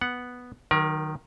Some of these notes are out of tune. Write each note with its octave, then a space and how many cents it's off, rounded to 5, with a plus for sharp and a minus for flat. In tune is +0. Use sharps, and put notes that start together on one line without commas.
B3 +0 F#5 +0
D#3 -15 F#3 +0 A#4 +35